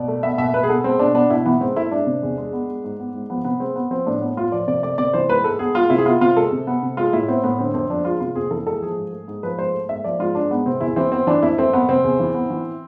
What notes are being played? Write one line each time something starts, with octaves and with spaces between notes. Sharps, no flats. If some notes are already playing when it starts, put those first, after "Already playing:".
Already playing: B2 D5
A3
B3 E5
B2 E5
B2 B4
G#4
B3 A4
G#3 C4
B2 D4
B3 D4
B2 E4
E3 B3
G#2 C4
A3 E4
G#2 D4
C3
E2
G#3
B3
G#3
G#2
B3
G#2
F3 B3
C3 B3
G#3 C4
B3
F3 C4
A2 D4
B3
A2 F4
F3 D5
C3 D5
A3 D5
C3 D5
E3 C5
G#2 B4
G#3 A4
B3 G#4
G#3 F4
C3 E4
G#4
B3 F4
C3 F4
G#3 A4
C3
B3
C3
G#3 F4
A2 E4
B3 C4
A2 B3
D3 C4
F2 C4
F3 D4
G#3 F4
C3 F4
F2 G#4
E3 A4
G#3 A4
F3 G#4
G#2
A3
G#2
F3 B4
G#2 C5
A3
G#2 E5
F3 D5
G#2 F4
G#3 D4
G#2 B3
C3 C4
E2 E4
E3 C4
B3 C4
E3 D4
F2 E4
A3 C4
F2 B3
C3 C4
E2
E3
B3
E3